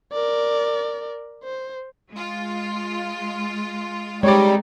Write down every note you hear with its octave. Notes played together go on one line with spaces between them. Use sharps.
A#4 D5
C5
G#3 F4
G3 G#3 C4 D#4 G4 C#5 D5